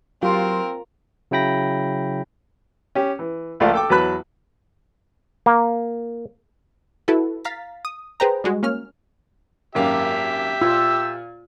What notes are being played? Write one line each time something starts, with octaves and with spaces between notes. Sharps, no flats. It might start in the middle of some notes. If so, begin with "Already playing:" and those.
F#3 C4 F4 G4 A#4
C#3 F#3 E4 G5 B5 A#6
C#4 G4
E3
C#2 F3 A3 A#3 D5 F5
A4 G5 D6
E2 F#3 B4 A5 B5 F#6
A#3
E4 F#4 A4 B4
F5 A#5 A6 B6
D#6
G#4 B4 C5 G5 A#5
G3 G#3 F#4
A#3 C#4 F6
G#1 F#2 A#3 G4 E5
A#2 F4 E6